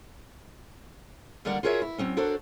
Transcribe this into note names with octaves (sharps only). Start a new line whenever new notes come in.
D#2 D3 G3 A#4 D5 F#5
F4 F#4 G#4 A#4 C#5 E5
E4
F#3 C4 C#4
D4 F#4 A4 A#4 C5 C#5